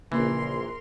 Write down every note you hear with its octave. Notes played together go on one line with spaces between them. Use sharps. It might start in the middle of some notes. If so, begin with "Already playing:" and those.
A#1 C#3 E3 A#3 A#4 C6